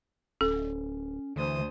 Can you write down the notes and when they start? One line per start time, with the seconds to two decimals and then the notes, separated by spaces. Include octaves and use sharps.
0.41 D1 C#4 A4
1.36 D2 D3 E3 C5 D#6